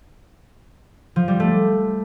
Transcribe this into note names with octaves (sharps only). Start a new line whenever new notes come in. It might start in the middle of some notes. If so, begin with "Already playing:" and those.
F3
G3
A3